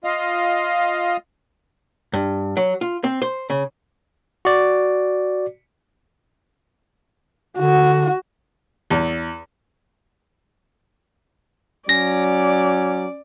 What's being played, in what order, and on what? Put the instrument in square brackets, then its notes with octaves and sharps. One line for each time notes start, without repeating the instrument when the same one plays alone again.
[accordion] F4 D#5 F5
[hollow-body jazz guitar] G2
F#3
F4
C4
C5
C#3
[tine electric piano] F#4 D5
[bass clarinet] D3 [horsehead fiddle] F#4
[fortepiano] E2
[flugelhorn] F#3 [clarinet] C#4 [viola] D5 [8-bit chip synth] A#6